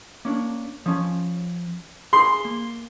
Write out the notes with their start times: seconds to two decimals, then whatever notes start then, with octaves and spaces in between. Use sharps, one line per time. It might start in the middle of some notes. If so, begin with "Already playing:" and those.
0.25 A#3 C#4 D4
0.86 F3 C#4
2.13 G#4 C6
2.45 A#3